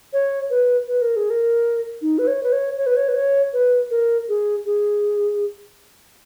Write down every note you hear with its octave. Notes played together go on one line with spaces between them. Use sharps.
C#5
B4
B4
A#4
G#4
A#4
D#4
B4
C#5
B4
C#5
C#5
B4
C#5
B4
C#5
B4
A#4
G#4
G#4